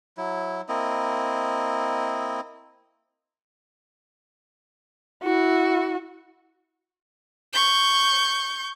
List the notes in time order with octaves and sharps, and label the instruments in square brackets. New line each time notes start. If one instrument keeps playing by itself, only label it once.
[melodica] F#3 E4
A#3 C4 E4 D#5
[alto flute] E4 [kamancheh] F#4
[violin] C#6 G6